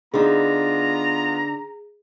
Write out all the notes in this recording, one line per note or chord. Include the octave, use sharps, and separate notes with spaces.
D3 B3 D#4 F4 G#4 A#5